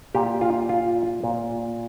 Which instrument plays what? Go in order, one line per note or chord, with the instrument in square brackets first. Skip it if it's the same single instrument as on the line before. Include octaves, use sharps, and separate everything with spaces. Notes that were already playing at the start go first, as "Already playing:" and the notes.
[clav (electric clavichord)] A#2 G4
F4
F4
A#2